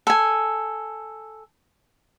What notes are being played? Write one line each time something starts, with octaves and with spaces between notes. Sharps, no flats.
A4 G#5